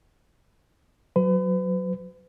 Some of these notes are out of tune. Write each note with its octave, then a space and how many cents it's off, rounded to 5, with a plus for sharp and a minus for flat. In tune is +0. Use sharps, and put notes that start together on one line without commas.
F#3 +0 B4 +40